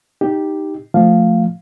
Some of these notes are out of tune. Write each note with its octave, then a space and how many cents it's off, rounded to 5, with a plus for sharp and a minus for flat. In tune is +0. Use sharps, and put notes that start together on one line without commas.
D#4 +0 G4 +0
F3 +0 A3 +0 F5 +0